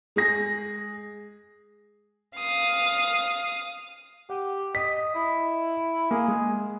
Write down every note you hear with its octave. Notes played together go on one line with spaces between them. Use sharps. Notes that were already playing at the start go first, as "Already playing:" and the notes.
G#3 G#4 A#6
F5 D#6
G4 F#5
D#5 B6
E4
A#3 G#4
G#3